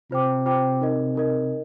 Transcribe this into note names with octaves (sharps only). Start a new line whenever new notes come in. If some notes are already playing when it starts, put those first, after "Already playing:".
C3 F4 C5 G5 D6
F4 C5 G5 D6
D#4 A#4 D#5
D#4 A#4 D#5